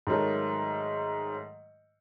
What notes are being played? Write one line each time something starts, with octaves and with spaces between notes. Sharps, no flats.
G#2 D#3 F#3 A3